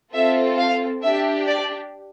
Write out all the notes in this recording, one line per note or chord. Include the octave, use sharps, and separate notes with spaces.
C4 F4 A4 E5
F5
D4 G4 E5
D5